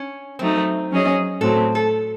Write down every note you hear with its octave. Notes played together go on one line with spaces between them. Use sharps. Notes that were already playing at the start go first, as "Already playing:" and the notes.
Already playing: C#4
F#3 A3 C4 D#4
F#3 C#4 G#4 D#5
A2 F#3 C4 A4
A4